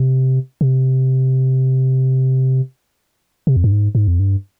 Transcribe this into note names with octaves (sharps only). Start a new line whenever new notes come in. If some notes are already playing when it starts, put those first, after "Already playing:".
Already playing: C3
C3
C3
F2
G2
G#2
G#2
F2
G2